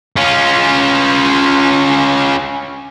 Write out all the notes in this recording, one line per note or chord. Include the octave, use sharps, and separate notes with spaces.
C#4 F4